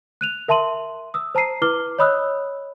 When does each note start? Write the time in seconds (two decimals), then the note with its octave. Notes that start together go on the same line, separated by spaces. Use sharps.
0.21 F#6 D#7 F7
0.48 A#4 E5 A5 C6 D#7 F#7
1.14 D#6 E6
1.35 C5 A5 A#5 C7 D#7
1.62 E4 B4 D6 F6 G7
1.99 C#5 D#5 B5 D#6 E6 F#6